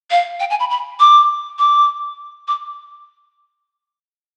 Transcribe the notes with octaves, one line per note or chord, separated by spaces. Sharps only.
F5
G5
G#5
B5
B5
D6
D6
D6